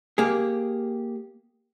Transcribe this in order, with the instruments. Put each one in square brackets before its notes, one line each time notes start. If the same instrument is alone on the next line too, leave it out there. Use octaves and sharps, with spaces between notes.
[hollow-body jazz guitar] A#3 G4 G#4